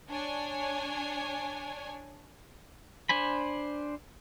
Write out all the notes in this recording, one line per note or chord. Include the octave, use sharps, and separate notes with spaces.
D4 C#5 G#5
D4 C5 G#5 B5